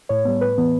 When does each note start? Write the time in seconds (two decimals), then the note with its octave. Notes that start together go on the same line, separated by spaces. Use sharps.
0.09 A2 C#5
0.25 G3 B3
0.41 A2 B4
0.58 E3 B3